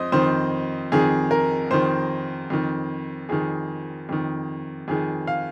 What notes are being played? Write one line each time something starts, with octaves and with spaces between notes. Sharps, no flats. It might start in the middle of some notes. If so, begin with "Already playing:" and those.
Already playing: F2 C5 D#5
F2 D#3 C5
F2 D#3 G#4
A#4
F2 D#3 C5
F2 D#3
F2 D#3 G#4
F2 D#3
F2 D#3 G#4
F5